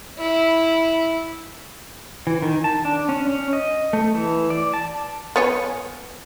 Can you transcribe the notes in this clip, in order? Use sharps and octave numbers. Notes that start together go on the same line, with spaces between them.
E4
E3
D#3
A5
D4
C#4
C#4
D#5
A3
E3
D5
A5
B3 C#5 G#5